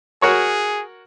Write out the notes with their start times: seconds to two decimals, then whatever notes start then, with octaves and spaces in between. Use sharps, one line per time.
0.22 F#4 G#4 A#4 C#5